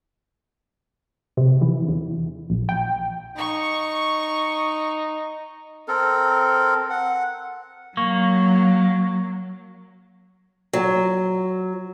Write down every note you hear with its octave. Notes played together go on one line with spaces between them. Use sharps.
C3
E3
E2
A#1
G5
D#4 C#6
C4 A4 A#4
F#5
F#3 A#3 C#6
F#3